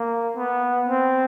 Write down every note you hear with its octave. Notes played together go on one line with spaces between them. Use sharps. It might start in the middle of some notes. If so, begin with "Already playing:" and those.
Already playing: A#3
B3
C4